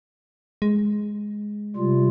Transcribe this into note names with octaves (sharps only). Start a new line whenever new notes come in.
G#3
C3 G3 F4